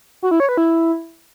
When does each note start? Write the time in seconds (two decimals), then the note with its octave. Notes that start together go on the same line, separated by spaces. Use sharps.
0.23 F#4
0.31 E4
0.40 C#5
0.49 B4
0.57 E4